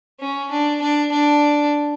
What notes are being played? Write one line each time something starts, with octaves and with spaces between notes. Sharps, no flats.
C#4
D4
D4
D4